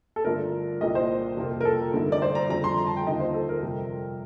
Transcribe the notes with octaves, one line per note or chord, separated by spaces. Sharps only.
A4
G2 D3 A3 D4 F4 A#4
C2 A#2 G3 A#3 D4 D#5
C5
F2 C3 F3 A#3 F4
A#4
A4
G2 D3 A3 D#4
D5
C5
A#5
F2 D3 G3 C4 A#5
C6
A#5
A5
G5
D#2 D3 F3 D#5
C5
A4
A#4
F2 C3 G3